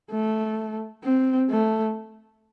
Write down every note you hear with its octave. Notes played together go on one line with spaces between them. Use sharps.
A3
C4
A3